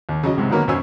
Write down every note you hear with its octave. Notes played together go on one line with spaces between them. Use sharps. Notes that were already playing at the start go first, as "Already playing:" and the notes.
D#2
C#3 F#3 D#5
C#2 G#2 C3
D3 D#3 F#3 A#3 B3 C#4
F#2 B2 C5 C#5 G#5 E6